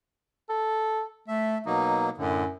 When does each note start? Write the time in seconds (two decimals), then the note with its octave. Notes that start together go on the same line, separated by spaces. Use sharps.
0.49 A4
1.28 A3 E5
1.66 B2 F#3 A#3 D#4
2.18 F#2 A2 D3